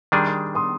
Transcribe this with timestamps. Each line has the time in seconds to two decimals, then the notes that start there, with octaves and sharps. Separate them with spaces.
0.12 D#3 G3 D4 G#4 C6 D#6
0.55 C6 D#6